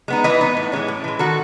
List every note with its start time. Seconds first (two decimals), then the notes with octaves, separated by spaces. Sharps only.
0.08 G#3 B3 D#4
0.24 E3 B4 D#5
0.41 B3 D#4
0.57 A2
0.72 E3 G#3 C#4
0.88 A2
1.04 E3 G#3
1.19 D#3 F#4 A4